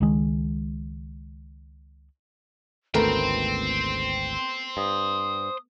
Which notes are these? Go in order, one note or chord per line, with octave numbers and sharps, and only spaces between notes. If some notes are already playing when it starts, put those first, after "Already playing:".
C#2 D#3 G#3
G#1 D2 A3 B3 A#4 C5 G5 C7
G2 D#6